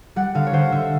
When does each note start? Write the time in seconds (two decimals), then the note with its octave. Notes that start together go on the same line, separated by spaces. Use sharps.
0.16 G3 F#5
0.35 D3 F5
0.47 C#5
0.53 D3 C5
0.72 D3 E5